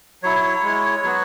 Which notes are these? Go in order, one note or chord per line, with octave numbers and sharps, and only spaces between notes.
F#3 E4 C#5
G#3 E4
F#3 B3 F#4